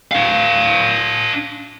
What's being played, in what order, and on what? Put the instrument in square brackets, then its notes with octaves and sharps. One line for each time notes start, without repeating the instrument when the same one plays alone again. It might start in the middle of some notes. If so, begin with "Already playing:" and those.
[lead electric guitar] D4 F5